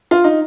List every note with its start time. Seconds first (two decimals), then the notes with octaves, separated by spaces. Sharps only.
0.11 F4
0.24 D#4